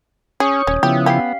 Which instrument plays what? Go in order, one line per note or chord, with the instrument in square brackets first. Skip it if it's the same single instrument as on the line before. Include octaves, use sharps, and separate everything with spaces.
[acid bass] C#4 [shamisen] G#4 [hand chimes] C#5 D#6 [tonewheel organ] C#6
[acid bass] D#1 [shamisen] C#4
[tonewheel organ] C#3 F3 E4 [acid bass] B3 [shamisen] G4
[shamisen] C#4 G4 [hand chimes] F5 C7